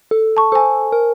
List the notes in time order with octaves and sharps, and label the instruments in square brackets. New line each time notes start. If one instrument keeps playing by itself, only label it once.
[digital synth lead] A4
[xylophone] A5 C#6
[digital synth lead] A4 [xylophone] C5 G#5
[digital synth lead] A#4